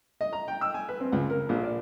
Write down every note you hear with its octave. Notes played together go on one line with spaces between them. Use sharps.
D#5
A#5
G5
E6
G#5
B4
C4
C#2
A#4
A#1
D5